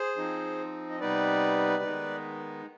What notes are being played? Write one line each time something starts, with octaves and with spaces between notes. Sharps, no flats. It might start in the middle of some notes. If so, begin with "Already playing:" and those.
Already playing: G#4 C5
F3 C4 D#4
D#5
C3 G3 B3 D#4 B4 D5
D#3 G#3 B3 D#4